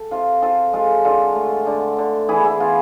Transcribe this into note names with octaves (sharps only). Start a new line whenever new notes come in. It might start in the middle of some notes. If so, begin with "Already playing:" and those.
Already playing: A4
C3 F4
C4 F4 A4
G#3 F4 A4
D3 F4 A4
A3
D3
D3
E3 E4 G#4
E4 G#4
B3 F4